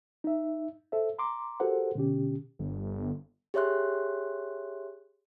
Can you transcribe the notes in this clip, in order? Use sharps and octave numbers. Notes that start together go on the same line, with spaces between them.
D#4 E5
A4 C5 E5
A#5 C6 D6
F#4 G4 A4 A#4 C5 F#5
B2 D3 C#4 G4
G1
G4 G#4 C#5 E5 C6 F#6